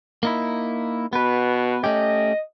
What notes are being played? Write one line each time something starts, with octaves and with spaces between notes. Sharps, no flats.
A#3 D#4 E4
B2 B3 B4
A3 C#4 G4 D#5